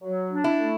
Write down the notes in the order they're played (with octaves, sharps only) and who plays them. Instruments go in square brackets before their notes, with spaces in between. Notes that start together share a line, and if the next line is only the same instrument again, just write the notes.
[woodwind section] F#3
D4
[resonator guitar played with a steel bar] E4
[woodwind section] A3